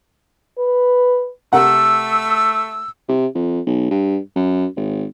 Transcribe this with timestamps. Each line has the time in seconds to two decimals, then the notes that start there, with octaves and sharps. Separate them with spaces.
0.58 B4
1.53 C3 A3 A#4 F#5 E6
3.09 C3
3.35 F2
3.66 B1
3.91 G2
4.35 F#2
4.76 G#1